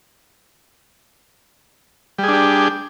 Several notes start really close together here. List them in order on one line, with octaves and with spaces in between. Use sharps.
G3 G#4 D4 G4